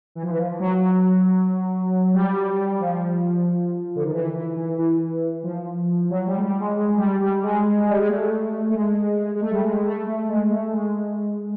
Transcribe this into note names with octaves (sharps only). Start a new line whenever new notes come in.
E3
F3
E3
F3
F#3
G3
F3
D3
D#3
E3
E3
E3
E3
F3
F#3
G3
G#3
G3
G#3
G#3
G3
G3
G#3
G3
G#3
A3
A3
G#3
G#3
A3
G3
G#3
A3
A3
G#3
A3
G#3